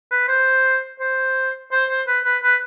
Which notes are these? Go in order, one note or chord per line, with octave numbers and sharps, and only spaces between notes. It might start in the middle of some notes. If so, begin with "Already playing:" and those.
B4
C5
C5
C5
C5
B4
B4
B4